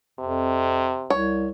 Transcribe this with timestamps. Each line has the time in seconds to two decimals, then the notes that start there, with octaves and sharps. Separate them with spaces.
0.20 F2 C3
1.10 C2 C#5